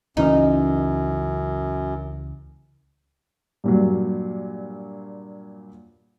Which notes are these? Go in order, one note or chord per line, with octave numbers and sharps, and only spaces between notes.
C#2 F#2 E3 C#4 D#4
G2 A#2 F#3